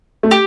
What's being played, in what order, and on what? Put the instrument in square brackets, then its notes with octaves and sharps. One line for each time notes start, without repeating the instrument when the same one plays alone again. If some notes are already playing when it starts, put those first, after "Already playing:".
[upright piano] A3
[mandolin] G4